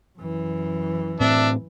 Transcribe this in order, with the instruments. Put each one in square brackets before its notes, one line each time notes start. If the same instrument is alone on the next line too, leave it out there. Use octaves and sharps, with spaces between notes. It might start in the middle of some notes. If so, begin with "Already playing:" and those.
[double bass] F#2 E3
[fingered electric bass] A2 C4 [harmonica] D4 E5